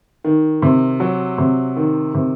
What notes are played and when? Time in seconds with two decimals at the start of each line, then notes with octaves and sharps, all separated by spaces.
0.24 D#3
0.62 C3
1.00 F#3
1.38 C3
1.76 D#3
2.14 C3